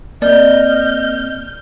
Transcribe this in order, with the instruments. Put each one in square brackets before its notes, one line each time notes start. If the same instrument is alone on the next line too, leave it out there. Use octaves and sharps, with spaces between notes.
[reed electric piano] A#3 C4 [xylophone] D5 [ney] D#5 [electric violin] F6 G6